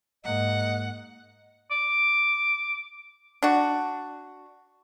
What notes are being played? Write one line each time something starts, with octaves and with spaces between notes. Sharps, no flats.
G#2 A#3 D#5 F#5
D6
D4 F#4